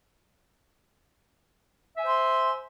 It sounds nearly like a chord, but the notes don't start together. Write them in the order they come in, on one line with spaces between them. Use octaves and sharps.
E5 G#5 C5 C6